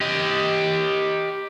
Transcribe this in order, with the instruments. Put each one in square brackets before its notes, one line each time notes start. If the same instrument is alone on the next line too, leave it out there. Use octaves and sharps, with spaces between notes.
[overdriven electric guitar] G4 D#5